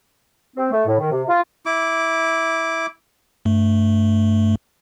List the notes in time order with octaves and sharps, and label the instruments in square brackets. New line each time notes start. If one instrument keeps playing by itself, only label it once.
[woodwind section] C4
A3
A2
D#3
C3
F4
[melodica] E4 D6
[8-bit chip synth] G2 A3